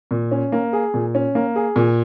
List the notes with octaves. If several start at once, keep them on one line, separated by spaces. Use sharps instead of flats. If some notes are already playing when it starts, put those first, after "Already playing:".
A#2
C#4
A#3
G#4
A#2
C#4
A#3
G#4
A#2